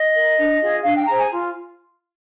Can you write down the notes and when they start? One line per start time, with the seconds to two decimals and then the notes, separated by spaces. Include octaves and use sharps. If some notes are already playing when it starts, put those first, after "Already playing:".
Already playing: D#5
0.15 A#4
0.38 D4
0.61 F4 G#4
0.83 D4 F5
0.95 G5
1.06 G#4 C5 A#5
1.18 G#5
1.30 F4